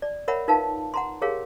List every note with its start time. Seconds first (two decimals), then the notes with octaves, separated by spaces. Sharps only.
0.02 D5
0.28 A#4 C#5 E5 F#5 B5
0.48 D#4 F4 A#4 B4 F5 A5
0.94 F#5 A#5 C6
1.21 G4 G#4 A#4 C#5 F5